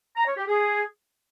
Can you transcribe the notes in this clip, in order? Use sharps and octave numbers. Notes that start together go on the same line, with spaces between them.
A#5
C#5
G4
G#4